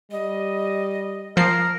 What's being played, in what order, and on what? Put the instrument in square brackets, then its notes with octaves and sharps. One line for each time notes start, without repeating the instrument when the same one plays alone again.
[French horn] G3 [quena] D#5
[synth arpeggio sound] F3 C7 [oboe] A#4